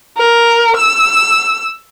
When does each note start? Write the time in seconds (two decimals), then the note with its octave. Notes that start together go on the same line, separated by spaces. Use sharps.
0.18 A#4
0.76 E6